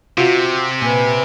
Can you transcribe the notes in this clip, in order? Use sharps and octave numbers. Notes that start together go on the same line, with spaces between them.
C3 F4 F#4
A#2 B4 G#5